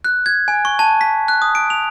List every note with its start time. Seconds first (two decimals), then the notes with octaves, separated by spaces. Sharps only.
0.04 F#6
0.26 G#6
0.48 G#5
0.65 C#6
0.79 A5
1.01 B6
1.28 F#6
1.42 D#6
1.55 D7
1.70 F7